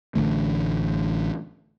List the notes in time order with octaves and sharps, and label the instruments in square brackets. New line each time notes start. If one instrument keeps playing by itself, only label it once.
[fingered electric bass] A1 D3 A3